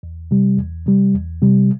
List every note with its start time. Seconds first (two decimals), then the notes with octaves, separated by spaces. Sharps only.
0.03 E2
0.31 C3 G3
0.58 E2
0.86 C3 G3
1.14 E2
1.42 C3 G3